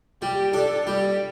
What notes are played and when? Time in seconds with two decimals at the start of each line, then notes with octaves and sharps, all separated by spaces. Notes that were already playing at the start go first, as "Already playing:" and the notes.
0.22 G3 G4
0.53 D4 A4
0.87 G3 G4